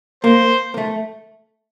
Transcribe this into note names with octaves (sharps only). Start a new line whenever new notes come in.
A#3 C5
A#3
A3